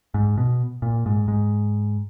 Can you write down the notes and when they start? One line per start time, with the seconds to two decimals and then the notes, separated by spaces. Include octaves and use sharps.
0.14 G#2
0.37 B2
0.82 A#2
1.06 G#2
1.28 G#2